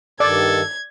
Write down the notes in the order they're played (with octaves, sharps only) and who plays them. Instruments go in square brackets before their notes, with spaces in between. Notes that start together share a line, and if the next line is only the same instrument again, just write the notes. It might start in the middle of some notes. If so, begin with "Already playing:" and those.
[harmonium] G2 D#3 [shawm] A4 [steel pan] D5 [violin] G#6